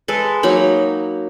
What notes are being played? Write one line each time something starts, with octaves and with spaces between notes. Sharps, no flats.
G#3 A4 B4
F#3 A#3 D#4 B5